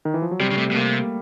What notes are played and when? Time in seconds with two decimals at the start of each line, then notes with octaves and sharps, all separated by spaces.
0.05 D#3
0.14 E3
0.22 F3
0.31 F#3
0.40 C3 G3
0.51 C#3
0.57 C3 A3
0.71 B2
0.76 C3 A#3